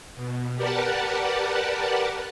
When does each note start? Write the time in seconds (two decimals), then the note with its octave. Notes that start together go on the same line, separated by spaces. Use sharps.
0.15 B2
0.55 G4 A#4 B4 D5 F#5 A5